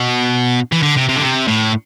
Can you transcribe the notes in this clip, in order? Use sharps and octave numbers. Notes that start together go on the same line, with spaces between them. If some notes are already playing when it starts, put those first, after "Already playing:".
Already playing: B2
E3
D3
C3
C3
D3
C3
A2